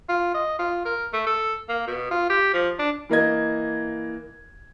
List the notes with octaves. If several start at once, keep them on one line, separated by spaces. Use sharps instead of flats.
F4
D#5
F4
A#4
A3
A4
A#3
B2
F4
G4
F3
D4
E3 A#3 D#5 G#6